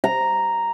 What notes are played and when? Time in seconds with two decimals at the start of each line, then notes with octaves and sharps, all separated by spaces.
0.04 A#5